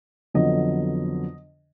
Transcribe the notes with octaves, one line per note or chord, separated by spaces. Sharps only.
F2 D3 F#3 B3 D#5